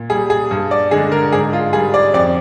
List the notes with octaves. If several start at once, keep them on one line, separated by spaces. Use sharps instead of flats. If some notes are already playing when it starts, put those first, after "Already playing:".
Already playing: A#2
G3 G#4
G#4
G2
D5
D3 G#3 G#4
A#4
G#2 G#4
F4
G3 G#4
D5
F2 D5